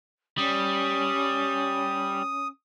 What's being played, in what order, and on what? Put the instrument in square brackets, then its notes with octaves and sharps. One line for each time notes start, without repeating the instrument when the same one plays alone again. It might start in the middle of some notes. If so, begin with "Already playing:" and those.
[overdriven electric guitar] G3 [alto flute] C#4 [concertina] D#6